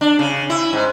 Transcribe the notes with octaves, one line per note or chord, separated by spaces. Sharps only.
D4
C#3
E4
G#2